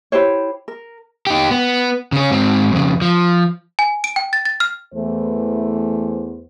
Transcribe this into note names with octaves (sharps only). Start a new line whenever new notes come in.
E4 G4 C5 C#5
A#4
D#4 G4
B3
C#3 C#4
G#2 C4
F2 C#3
F3
G#5
D7
G5
A6
A6
F6
E2 E3 A3 C5